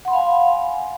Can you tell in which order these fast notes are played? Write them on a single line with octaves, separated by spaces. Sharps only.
F#5 C6 B5 F5 G#5